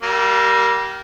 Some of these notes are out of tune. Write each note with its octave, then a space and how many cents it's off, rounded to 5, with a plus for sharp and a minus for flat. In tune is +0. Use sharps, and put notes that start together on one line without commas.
G3 -25 A#3 +0